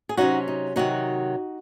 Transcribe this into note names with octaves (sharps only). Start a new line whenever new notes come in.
G#4
C3 F#3 C#4 D#4 F#4
D#4
C3 D#3 F#3 D#4 F#4